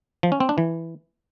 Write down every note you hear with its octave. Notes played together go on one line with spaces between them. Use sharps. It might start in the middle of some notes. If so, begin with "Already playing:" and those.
F3
C#4
C4
D4
E3